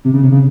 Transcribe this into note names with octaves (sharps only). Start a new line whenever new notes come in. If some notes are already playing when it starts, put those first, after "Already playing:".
C3
C#3
C3
C#3